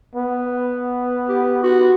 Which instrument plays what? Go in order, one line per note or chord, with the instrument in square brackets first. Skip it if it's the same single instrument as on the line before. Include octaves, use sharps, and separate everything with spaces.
[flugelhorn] B3
[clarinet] G4
F#4